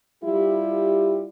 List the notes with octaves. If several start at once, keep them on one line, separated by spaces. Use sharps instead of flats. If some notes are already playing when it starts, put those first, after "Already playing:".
G3 E4 F4 G4